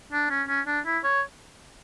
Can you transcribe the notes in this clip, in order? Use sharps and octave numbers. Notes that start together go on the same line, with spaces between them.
D4
C#4
C#4
D4
E4
C#5